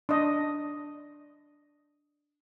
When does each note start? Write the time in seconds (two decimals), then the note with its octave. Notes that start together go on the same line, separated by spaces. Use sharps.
0.09 D4 D#5